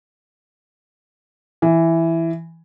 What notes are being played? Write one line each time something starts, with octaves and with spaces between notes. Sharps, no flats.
E3